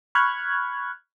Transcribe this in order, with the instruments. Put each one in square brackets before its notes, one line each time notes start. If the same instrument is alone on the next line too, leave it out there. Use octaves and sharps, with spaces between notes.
[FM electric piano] B5 C#6 F6 F#6 G#6